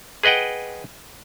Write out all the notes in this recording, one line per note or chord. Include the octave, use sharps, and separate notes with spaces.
G#4 B4 D#5 F#5 G5